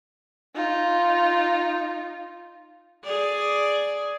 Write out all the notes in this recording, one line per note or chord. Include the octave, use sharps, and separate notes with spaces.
D#4 F4
G#4 D5